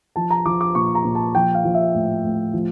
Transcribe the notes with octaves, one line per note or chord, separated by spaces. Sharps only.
F3 A5
A#5
F3 D6
D6
A#2 C#6
A#5
A#2
A5
F3 G5
F5
F3
E5
A2
A2
F3